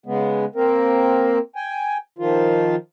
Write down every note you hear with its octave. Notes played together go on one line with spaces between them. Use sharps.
C#3 G#3 B3
A#3 C4 A#4
G5 G#5
D#3 F3 F4